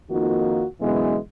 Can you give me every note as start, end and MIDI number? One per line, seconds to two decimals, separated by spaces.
0.10 0.64 41
0.10 0.64 51
0.10 0.64 58
0.10 0.64 63
0.10 0.64 65
0.10 0.64 66
0.81 1.16 42
0.81 1.16 47
0.81 1.16 50
0.81 1.16 52
0.81 1.16 56
0.81 1.16 59